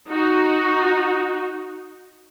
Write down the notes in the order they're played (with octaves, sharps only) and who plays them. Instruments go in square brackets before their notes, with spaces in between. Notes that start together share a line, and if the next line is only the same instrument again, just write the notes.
[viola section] D#4 F#4